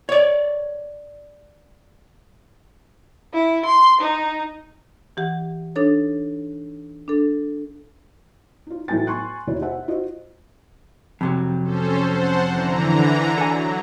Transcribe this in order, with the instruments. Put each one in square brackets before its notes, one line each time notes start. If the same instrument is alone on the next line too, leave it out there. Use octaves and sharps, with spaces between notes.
[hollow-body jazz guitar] C#5 D5
[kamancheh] E4
C6
D#4
[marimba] E3 G4 F#5
D4 D#4 A4 C#5
D4 A4
[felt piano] D#4 F4
A2 E3 F#3 B3 G5 A6
G#5 C6 C#6 F#6
D#2 B2 E3 E4 C#5
G4 C5 E5 F#5
F4 F#4 C5 D#5
[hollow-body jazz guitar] F2 C3 F#3
[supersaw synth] C#4 A4 C5
C5 F#5 A5
D3 E3 A#5
[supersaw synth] F#3 [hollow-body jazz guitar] A4 G#5